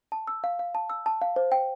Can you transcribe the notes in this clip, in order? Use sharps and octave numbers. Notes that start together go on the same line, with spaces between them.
A5
E6
F5
F5
A5
E6
A5
F5
C5
G5